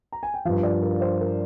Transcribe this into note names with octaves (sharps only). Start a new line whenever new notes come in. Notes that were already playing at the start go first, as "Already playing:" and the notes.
A#5
G#5
G5
G2 F3 F5
D5
A#4
C5
A#4